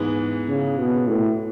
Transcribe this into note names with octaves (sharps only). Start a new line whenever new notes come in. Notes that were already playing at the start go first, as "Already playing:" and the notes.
Already playing: G#2 E3 B3 E4 G#4
C#3
B2
A2